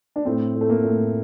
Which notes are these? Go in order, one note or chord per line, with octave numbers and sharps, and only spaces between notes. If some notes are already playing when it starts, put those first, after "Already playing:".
D4
A2 C4
A2
A3
A#3
A2